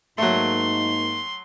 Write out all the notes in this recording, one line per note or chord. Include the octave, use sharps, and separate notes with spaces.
G#2 F#3 A3 A#3 D#4 C6